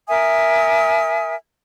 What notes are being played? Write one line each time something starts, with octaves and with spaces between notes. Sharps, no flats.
A#4 E5 G#5 D#6